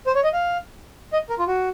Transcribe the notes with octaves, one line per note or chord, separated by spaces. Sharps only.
C5
C#5
D#5
F5
D#5
A#4
F4
F#4